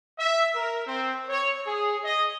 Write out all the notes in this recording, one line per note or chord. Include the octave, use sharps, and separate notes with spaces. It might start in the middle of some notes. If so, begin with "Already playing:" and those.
E5
A#4
C4
C#5
G#4
D#5